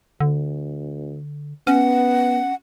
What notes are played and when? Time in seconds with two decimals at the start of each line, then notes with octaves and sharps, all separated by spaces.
0.20 D2 D3
1.67 B3 C#4 F#5